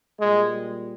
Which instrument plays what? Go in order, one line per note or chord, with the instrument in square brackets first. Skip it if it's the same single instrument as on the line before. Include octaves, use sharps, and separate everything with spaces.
[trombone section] A#2 G3 G#3